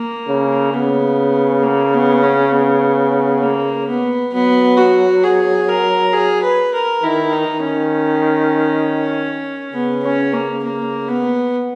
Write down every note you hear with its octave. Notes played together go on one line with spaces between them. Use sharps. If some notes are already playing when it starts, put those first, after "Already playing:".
Already playing: A#3
C#3
C#3 B3
A#3
B3
C#4
B3
A#3
B3
F#3 B3
F#4
G#4
A#4
G#4
B4
A#4
D#3 E4
D#4
D#3
C#4
C#3 B3
C#4
A#3
A#3
B3